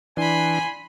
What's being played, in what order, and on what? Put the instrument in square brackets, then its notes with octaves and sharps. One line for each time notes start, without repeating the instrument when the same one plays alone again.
[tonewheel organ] E3 D4 [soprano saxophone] G#5 [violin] B5 C6